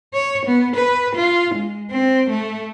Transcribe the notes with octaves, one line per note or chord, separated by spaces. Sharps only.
C#5
B3
B4
F4
G#3
C4
A3